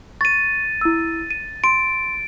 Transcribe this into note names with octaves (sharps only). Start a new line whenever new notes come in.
C#6 A6 D#7
E4 E6
D#7
C6 D7